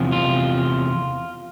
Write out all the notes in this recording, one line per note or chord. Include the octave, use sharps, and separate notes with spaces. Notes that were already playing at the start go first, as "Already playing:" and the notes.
Already playing: E2 C3 F3
F4